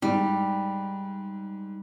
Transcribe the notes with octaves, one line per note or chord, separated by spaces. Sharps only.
G#2 G3